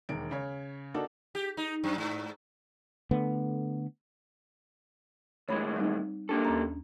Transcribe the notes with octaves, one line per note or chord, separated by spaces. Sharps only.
E1 D#2 D7
C#3 C#5
A#3 D4 D#4 F#4 A4
G4
D#4
F#2
G#2
D3 A3 B3
D#2 A2 G#3 C#5 B5
G3 C4 D#4
A#3 D4 G4 A4
D#2 C#4 A#5